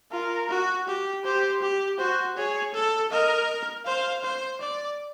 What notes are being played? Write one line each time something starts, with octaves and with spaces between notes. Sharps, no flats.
F4 A#4
F#4
G4
G4 C5
G4
F#4 C5
G#4 C#5
A4
A#4 D#5
C5 F5
C5
D5